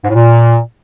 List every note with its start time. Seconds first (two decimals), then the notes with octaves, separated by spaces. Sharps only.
0.04 G#2
0.09 A2
0.14 A#2